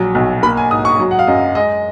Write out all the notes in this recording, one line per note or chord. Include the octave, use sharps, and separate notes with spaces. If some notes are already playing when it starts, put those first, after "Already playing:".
Already playing: A#1 F#3
B1
A#3 B5
G#5
G#2 D#6
C#6
F#3
F#5
F5
F#2 D#5
G#3 D#5